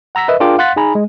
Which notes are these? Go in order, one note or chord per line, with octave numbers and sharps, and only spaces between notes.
F#5 A#5 E6 A#6 B6
A#4 B4 D#5 E5
D4 F4 G#4 A#4 G5 D6
F5 F#5 C6 F#6 A6 B6
D#4 G#4 G#5 A#5 B5
G#3